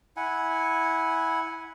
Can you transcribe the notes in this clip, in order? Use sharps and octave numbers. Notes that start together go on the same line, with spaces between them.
E4 F#5 G#5